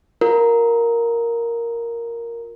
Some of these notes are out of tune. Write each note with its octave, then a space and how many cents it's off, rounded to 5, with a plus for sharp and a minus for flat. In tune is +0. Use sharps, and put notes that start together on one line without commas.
F4 +30 A#4 +0